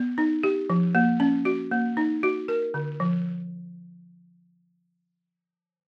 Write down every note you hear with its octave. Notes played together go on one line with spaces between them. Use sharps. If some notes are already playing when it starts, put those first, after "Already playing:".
Already playing: B3
D#4
G4
F3
A#3
C#4
F#4
A#3
D#4
F#4
A#4
D3
F3